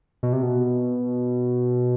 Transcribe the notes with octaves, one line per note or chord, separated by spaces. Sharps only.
B2
C3
B2